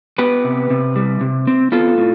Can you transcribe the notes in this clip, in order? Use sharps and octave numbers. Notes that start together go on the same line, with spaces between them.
B3 G4 B4
C3
C3
G3
C3
C4
B3 F4 A4
A2